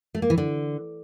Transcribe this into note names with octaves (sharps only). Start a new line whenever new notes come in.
A3
A#3
E3
D3